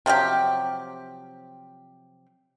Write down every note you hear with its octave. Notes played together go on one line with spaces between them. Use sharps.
C3 F3 F#3 G4